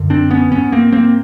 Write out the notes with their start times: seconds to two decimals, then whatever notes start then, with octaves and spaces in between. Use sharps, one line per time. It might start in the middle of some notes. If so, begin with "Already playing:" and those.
Already playing: F#2 D3
0.10 C4 D4
0.31 B3 C#4
0.52 G#2 B3 C#4
0.72 A#3 C4
0.92 A#3 C4